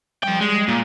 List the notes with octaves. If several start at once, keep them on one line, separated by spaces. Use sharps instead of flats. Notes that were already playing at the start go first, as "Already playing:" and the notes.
F3 G3 G5
G#3
A#2